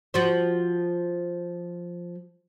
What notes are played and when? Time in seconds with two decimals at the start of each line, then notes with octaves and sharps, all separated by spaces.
0.14 F3 F#4 C5